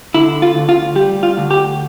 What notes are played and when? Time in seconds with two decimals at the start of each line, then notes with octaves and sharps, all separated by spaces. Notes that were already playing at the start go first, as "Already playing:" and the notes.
0.14 D3 E4
0.42 F4
0.55 D2
0.69 F4
0.96 G3 G4
1.23 F4
1.37 D2
1.51 G4